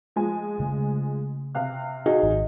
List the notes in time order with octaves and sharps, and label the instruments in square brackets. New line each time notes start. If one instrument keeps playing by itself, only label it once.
[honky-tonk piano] F3 G#3 G#5
[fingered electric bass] C#3 A3
[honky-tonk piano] C3 F5 F#6
[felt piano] D#4 F#4 G#4
[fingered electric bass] G#1